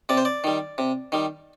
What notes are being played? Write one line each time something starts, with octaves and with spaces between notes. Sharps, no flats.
C3 D5
C5
D5
D#3 G3
C3
D#3 G3